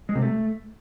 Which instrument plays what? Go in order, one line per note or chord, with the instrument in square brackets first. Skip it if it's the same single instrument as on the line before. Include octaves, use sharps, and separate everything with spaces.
[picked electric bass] G#3
C3
A3